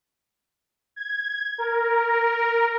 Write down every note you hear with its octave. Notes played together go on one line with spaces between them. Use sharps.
G#6
A#4